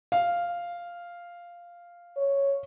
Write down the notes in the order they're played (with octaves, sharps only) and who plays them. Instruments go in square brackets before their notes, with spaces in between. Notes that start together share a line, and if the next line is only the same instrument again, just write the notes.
[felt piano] F5
[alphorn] C#5